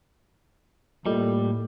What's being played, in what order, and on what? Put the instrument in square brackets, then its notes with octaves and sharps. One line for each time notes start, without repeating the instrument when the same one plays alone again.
[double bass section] A2 [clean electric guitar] G3 [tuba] A#3 [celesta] F4 A4 D#5